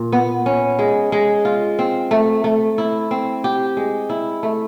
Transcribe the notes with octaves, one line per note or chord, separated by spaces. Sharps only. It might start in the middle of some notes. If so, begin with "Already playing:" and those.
Already playing: A#2
B3
C#4
G#3
G#3
F4
C4
A3
A3
E4
C4
G4
G#3
E4
A3